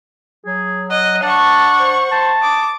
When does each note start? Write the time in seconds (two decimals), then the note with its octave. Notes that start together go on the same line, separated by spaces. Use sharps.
0.46 F#3 G#4
0.90 D#5 F#5
1.23 D4 F#5 A5 C#6
1.79 C5
2.12 C5 A5
2.42 D6 D#6